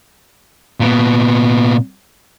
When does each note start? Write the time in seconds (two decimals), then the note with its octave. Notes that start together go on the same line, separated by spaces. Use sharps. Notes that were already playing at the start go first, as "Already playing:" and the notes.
0.80 A#2 B3